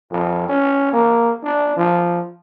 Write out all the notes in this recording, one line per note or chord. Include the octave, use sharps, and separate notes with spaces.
F2
C#4
A#3
D4
F3